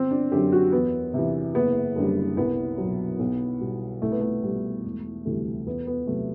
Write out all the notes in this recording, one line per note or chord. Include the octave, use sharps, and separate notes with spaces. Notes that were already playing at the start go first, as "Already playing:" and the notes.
Already playing: G1 C4
D4
F#2 D3 F#3 G4
F#4
E2 B3
C3 E3
F#1 B3
F#2 D3 G3
C2 B3
B2 F#3
B1
B2 G3
C2 A3
B3
A3
B2 G3
E1
D2 C3 E3 G3
E2 B3
B3
C3 F#3 A3